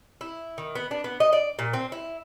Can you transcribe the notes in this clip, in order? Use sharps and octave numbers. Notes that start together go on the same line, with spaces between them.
E4
D#3
B3
D4
B3
D#5
D5
A#2
C4
E4